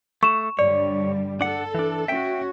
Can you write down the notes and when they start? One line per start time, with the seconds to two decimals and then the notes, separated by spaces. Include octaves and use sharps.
0.23 A3 C#6 E7
0.59 G2 D3 G3 C#5 D5
1.41 D4 A4 F#5
1.75 E3 D4
2.08 C#4 F#4 E5 G5